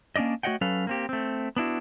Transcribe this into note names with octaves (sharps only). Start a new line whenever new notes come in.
A#3 C#4 D4 D5 D#5
A3 F#4 C#5 D#5 F#5 G5
F#3 C#4 A4 B4 F5
A#3 C4 G4
A3 C4
B3 D4 E4 F#4